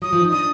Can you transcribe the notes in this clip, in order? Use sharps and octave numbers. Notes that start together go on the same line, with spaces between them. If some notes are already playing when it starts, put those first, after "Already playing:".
F#3 D#6
F3
D#4
D4 D#6